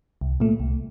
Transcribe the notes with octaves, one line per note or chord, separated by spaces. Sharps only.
C2
A#2 A3
C2